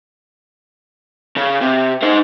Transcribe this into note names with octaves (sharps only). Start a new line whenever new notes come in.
C#3
C3
D#4 C5